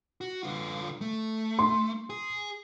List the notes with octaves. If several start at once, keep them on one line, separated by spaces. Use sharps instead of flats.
F#4
D3 F4
A3
C6
G#4